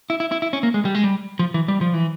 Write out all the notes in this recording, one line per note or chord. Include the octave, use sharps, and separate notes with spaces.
E4
E4
E4
E4
C#4
A#3
G#3
G3
G#3
G3
F3
E3
G3
F3
E3